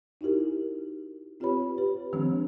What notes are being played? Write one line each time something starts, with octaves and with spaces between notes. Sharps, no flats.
D#4 E4 F#4 G4 A#4
C4 F4 G4 B4 C#5 B5
G4 B4
D#3 F3 G#3 C4 D4